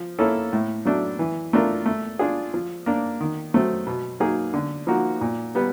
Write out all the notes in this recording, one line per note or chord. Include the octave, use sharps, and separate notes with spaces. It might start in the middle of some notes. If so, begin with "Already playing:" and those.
Already playing: F3
A#3 C#4 E4 A4
A2
F#3 A3 D4
E3
A3 D4 F4 A#4
A3
D4 F4 G#4
F3
A#3 D4
D#3
F#3 A3 C4
B2
F#3 A#3 D#4 G#4
D3
F3 A#3 D#4 F#4
A#2
G3 B3